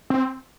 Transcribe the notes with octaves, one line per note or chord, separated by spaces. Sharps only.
C4